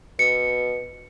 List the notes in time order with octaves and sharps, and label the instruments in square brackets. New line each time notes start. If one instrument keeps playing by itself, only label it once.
[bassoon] B2 [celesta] C#7